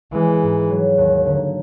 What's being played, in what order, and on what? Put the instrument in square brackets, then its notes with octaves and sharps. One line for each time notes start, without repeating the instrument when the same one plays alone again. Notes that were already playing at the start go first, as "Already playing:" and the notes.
[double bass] E3 [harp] G#3
[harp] G#2
F#3
D#2
D3